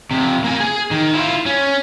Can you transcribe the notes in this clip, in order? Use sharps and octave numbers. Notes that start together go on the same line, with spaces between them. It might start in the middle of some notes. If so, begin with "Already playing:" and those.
F2 C3
A#3 G#5
G#4
D#3
E4 F4
C#4